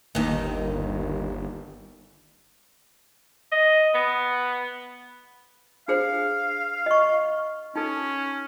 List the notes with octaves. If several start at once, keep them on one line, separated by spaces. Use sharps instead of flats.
G1 D#2 D#3
D#5
B3
D4 G#4 C5 F5
D#5 C#6
C#4 D#4 A4